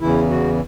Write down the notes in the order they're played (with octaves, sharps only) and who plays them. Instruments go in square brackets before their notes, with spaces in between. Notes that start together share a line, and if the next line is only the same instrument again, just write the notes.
[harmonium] E2 C#3 E3 E4
F#4